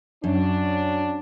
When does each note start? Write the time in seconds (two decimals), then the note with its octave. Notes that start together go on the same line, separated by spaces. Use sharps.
0.24 F#2 F#3 C#4 D4